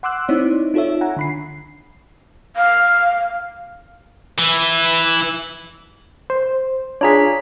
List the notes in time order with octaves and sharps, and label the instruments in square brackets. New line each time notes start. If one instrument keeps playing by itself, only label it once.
[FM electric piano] F#5 C6 D6 E6 F#6
C4 D#4 E4 C#5 D5
D#4 F4 A4 C#5 E5
F#5 G#5 A#5
D3 B5 C7
[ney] F5
[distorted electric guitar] E3 E4
[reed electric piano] C5
[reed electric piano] D4 F4 G#4 [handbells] C#5 A#5 B6